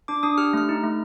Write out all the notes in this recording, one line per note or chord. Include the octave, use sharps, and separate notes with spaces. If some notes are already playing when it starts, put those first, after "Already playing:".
D4 D6
D4 D#6
G4 F6
A3 F6
D#4
A3